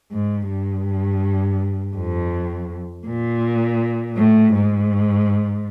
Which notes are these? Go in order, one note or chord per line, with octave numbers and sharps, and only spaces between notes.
G#2
G2
F2
A#2
A2
G#2